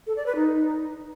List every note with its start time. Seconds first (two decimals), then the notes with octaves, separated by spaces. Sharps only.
0.07 A4
0.16 D5
0.26 B4
0.36 D#4